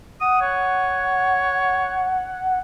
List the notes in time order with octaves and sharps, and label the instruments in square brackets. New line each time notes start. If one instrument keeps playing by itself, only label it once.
[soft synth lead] F#5 [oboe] D#6
[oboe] C#5